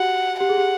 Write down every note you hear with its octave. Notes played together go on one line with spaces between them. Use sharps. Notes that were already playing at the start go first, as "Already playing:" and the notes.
Already playing: F#4 G4 F#5
G4 F#5
G#4
G4